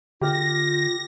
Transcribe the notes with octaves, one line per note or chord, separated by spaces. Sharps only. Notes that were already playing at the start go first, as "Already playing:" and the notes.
D3 F4 G4 F6 A#6